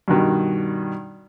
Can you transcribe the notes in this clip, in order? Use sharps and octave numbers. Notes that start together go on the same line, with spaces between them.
G2 B2 D#3